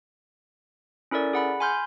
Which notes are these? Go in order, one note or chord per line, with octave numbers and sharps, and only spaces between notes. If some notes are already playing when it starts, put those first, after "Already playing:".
C#4 E4 A4 A#4 D5
G#4 F#5 B5
G#5 B5 C6 F6 G6